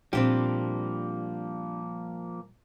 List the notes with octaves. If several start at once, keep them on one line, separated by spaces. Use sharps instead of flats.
A#2 F3 G3 A#3 C4 D4 G4